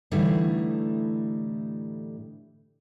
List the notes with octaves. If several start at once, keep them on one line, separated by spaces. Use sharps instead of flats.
A2 D3 E3 G3 A3 D#4